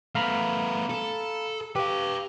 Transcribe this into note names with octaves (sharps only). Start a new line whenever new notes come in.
A3 B3 F5 A#5 B5
A4
G4 B4 F5